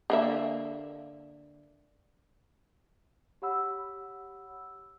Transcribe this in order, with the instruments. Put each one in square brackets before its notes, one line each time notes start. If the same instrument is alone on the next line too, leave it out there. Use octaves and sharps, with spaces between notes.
[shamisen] D3 A#3 E5
[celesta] G4 C#5 F#5 B5 E6